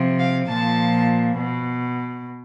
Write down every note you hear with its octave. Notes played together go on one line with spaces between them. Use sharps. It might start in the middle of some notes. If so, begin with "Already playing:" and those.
Already playing: C3 F3
F5
A#2 F3 A5
B2